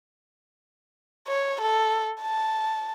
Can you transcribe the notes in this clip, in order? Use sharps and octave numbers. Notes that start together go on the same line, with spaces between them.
C#5
A4
A5